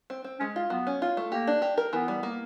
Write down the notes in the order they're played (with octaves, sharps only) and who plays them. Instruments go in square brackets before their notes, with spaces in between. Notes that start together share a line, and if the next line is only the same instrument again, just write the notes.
[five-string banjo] C4
C4
[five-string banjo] G#3 [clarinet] C#4
[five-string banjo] F4
[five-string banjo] F#3 [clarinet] B3
[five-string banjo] C#4
F4
A3
[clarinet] A#3 [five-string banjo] G4
[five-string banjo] D4
G4
A#4
[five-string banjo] E3 [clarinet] B3
[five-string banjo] G3
A#3